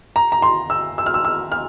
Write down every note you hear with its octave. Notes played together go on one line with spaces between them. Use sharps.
A#5
A#5
C6
E6
E6
F6
E6
E6
F6